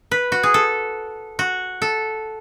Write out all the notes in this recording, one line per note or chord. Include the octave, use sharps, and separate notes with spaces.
B4
F#4
G#4
A4
F#4
A4